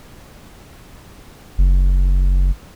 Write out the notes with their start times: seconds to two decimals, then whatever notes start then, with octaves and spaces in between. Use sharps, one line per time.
1.58 F#1